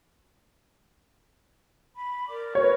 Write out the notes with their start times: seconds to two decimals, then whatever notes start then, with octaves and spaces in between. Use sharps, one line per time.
1.94 B5
2.29 A#4 D5 D6
2.55 F#4 A#4 B4 C#5